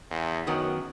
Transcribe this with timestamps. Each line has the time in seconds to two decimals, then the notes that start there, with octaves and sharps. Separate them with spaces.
0.11 E2
0.47 F#2 D#3 F#3 B3